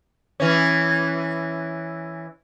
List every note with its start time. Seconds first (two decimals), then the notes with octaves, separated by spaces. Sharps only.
0.40 E3 C#4